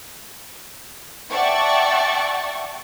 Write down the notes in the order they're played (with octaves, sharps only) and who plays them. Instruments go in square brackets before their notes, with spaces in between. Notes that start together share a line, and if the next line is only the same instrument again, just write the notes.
[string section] D5 E5 F#5 G5 A5 C#6